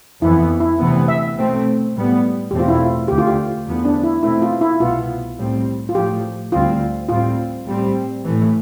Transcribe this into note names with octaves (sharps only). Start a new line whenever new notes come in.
F2 E3 B3 E4
E4
D2 C3 E3 B3
E5
B2 A3 C4
A2 G3 B3
E2 B2 A3 C4 G4
F4
E4
F4
D2 D3 A3 G4
F4
G4
E2 D3 F3 B3
D4
E4
B2 A3 C4 E4
F4
E4
C2 B2 B3 F4
A2 G3 C4
F4
A2 F3 A3 G4
D2 D3 G3 C4 F4
A2 G3 C4 F4
A2 G3 C4
A2 E3 A3